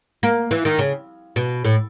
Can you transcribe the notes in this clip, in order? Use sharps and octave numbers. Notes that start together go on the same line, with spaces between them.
A#3
E3
D#3
C#3
B2
A2